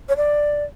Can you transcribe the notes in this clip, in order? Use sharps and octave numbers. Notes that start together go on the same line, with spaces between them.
C#5
D5